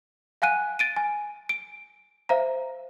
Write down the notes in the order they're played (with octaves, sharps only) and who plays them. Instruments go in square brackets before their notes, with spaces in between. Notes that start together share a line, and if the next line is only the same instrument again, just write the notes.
[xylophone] F5 F#5 G#5 F#6 D#7
A6 D7 D#7
G#5
D7
C5 E5 F5 A#5